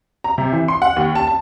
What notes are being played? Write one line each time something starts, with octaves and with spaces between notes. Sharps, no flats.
A#5
C3
E3
C6
F#5
D#2
A5
A5